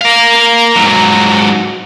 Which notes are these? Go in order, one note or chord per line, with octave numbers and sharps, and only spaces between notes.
A#4 F5
G#2 F#3